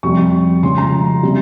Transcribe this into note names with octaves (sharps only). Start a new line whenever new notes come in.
F2 C3 G3 C4 C#6
C#3 F3 G#3 C6
A#5
C3 G3